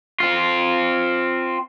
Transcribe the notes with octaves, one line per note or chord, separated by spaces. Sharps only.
C4 F4